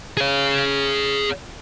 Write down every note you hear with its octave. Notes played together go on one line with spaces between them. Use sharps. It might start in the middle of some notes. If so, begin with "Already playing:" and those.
G#4 C#5